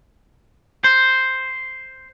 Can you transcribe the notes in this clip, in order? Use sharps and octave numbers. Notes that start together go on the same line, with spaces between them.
C5